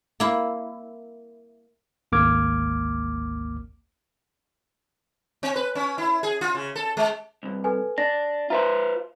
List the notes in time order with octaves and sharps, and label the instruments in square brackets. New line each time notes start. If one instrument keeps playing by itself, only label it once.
[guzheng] A#3 E4
[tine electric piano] G#1 D2 A#3 D6 F6 G#6
[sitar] C4
B4
C#4
E4
G#4
F4
C#3
A4
G#3
[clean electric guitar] C2 G2
[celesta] A4 B4 G#5
[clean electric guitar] D4 [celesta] A#6
[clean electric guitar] F4 B4 C5 [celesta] E5 A#5